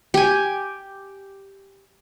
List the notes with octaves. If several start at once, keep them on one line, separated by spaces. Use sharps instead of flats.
G4 G#5